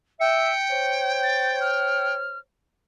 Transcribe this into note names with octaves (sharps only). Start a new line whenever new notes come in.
E5 G5 C#7
C5 C#5
A6
F6